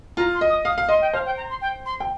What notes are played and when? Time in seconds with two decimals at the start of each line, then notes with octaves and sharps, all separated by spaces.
0.17 F4 A#5
0.34 C6
0.41 D#5
0.50 D#6
0.65 F5 D#6
0.78 F5
0.89 D#5 C6
1.01 G5
1.13 C5 F5
1.26 G5
1.37 A#5
1.50 C6
1.61 G5
1.85 C6
2.00 G5